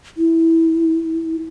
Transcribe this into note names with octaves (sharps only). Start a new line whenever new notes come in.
E4